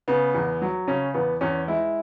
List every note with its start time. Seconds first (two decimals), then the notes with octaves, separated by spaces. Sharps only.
0.08 C#3 B3
0.35 E2
0.62 F#3
0.87 C#3 C#4
1.14 E2 B3
1.41 E2 C#4
1.67 G#3 E4